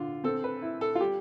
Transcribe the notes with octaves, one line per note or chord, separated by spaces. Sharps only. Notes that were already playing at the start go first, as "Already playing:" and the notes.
Already playing: D3 F4
C4 A4
B4
E4
A4
F4
G3 G4